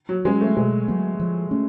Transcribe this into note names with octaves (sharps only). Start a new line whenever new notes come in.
F#3
F#3 G#3 C#4
A3
B2 G#3
F#3 B3
F3
A3 C#4